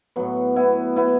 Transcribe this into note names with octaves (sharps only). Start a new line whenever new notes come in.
A2 F#3 B3
B3 E4
B3 E4